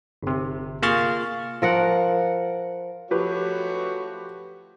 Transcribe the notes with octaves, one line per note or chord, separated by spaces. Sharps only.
G1 C3
A#3 F4 G#4 C#6 F6 A6
F3 A#4 F#5
F3 A3 F#4 G4 B4 C#5